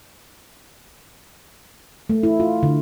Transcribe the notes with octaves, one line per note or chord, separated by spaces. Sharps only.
A3
E4
F4
D3